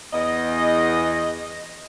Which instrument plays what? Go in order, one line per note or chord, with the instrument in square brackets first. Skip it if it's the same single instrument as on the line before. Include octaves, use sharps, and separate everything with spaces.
[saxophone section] E2 D#5